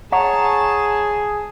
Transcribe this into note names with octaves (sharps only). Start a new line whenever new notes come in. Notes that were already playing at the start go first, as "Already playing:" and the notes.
G#4 C#5 F#5 A5 A#5